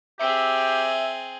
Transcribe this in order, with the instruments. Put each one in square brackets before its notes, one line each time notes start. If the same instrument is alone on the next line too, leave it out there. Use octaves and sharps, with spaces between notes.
[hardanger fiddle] C4 G#4 [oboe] G4 [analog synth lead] E5